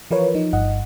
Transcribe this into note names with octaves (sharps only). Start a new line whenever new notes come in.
E3 F3 F4 A#4 B4 C#5
F3 D#4
G1 G2 D#5 F#5